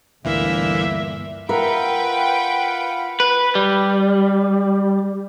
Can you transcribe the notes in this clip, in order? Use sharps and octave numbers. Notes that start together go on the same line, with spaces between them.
G1 D2 A#2 D3 E3 A#3 E5
F4 A#4 B4 E5 F#5 G5 B5
B4
G3